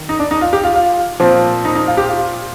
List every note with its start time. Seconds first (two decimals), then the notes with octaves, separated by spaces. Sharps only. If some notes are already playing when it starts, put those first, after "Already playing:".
Already playing: D#3
0.09 D#4
0.19 D4
0.31 D#4
0.41 F4
0.53 G4
0.64 F4
0.75 F4
1.20 A#2 F3 C4
1.65 D#4
1.75 D#4
1.87 F4
1.97 G4
2.09 F4